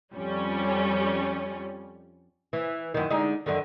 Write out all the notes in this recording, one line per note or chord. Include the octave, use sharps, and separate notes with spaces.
F2 G3 C#4
E3
F#2 D#3
D3 G#3 D#4
F#2 D3 D#3